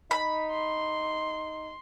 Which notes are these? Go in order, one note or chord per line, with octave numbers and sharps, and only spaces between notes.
D#4 B5
C6